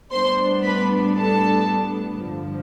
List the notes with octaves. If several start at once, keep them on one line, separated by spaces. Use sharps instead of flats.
A2 G3 B3 D4 C5 C6
B4 B5
A4 A5
G2 D3 F3